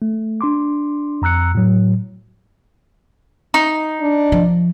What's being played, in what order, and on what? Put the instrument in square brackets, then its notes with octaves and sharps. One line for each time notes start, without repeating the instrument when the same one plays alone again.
[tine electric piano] A3
D4 C6 D6
F2 A#5 E6 F#6 C#7
A2 F#3
[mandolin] D#4
[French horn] D4
[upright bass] F3